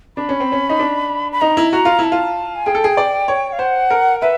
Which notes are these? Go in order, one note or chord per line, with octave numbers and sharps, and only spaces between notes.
D4 B5
C#4
C4
C#4
D#4
D4
B5
D#4 A#5
E4
F#4 A#5
F4
E4 A5
F4
G#5
G#4 G5
A4
G#4
D5
C#5
F5
C5 F#5
A#4
B4 E5